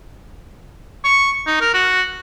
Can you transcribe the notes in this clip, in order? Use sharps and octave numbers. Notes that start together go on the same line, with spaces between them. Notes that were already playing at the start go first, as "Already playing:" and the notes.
C#6
D#4
A#4
F#4